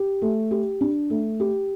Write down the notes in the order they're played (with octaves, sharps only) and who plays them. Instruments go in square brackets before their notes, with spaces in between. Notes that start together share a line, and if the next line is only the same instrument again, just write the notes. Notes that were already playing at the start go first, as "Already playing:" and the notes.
Already playing: [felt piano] G4
A3
G4
D4
A3
G4